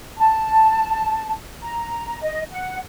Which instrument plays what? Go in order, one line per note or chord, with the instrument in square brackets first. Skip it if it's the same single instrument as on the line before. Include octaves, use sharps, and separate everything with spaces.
[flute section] A5
A#5
D#5
F#5